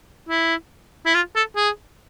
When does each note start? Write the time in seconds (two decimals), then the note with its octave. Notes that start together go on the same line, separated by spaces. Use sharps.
0.29 E4
1.06 E4
1.15 F4
1.36 A4
1.56 G#4